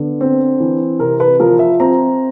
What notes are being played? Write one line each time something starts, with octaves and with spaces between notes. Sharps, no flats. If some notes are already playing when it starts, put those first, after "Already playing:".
Already playing: D3 B3
C4
E3
C3 A#4
B4
F3 A#4
E5
C4 A#5